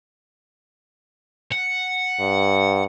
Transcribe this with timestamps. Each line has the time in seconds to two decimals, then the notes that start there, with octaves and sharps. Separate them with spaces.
1.52 F#5
2.20 G2